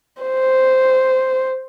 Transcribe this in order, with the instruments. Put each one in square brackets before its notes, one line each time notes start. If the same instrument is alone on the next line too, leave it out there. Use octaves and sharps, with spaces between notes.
[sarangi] C5